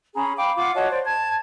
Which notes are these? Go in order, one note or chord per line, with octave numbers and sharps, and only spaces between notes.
C#4 G#4 A#5 B5
F5 G5 B5 D6
F4 F#5 D6
F#4 C#5 D#5 A5
C5 D5
A5 G#6